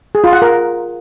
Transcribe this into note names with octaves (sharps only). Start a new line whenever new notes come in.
G#4
F4
F#5
A#4